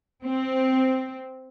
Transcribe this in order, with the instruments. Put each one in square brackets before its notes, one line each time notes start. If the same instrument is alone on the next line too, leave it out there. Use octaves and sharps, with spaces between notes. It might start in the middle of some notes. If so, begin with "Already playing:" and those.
[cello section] C4